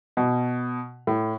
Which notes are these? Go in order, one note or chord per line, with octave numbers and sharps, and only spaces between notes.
B2
A2